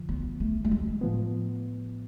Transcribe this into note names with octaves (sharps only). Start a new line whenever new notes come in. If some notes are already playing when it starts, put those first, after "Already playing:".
Already playing: F#2 D3 F3
B3
A3
A3
G#3
A2 F3 B3